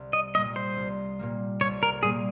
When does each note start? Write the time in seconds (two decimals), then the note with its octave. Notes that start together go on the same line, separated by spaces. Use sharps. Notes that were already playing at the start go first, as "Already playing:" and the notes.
Already playing: C2
0.13 D#5
0.35 A#2 G3 A#3 D#5
0.56 C5
0.76 C2
1.19 A#2 G3 A#3
1.61 C2 C#5
1.83 A#4
2.03 A#2 G3 A#3 G#4